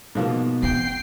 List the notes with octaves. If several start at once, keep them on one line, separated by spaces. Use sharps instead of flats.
G#2 B2 F3 A#3
E3 C4 G5 C7